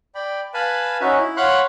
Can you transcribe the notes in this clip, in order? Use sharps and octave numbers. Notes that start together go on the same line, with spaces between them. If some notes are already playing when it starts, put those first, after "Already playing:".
D5 G5 B5
B4 F5 G#5 A5 B5
C#4 D#4 F#4 E5
E4
C#5 F5 F#5 B5 C6 F#6